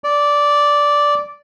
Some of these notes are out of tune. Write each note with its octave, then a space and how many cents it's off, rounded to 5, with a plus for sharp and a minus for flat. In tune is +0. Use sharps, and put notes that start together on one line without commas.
D5 -10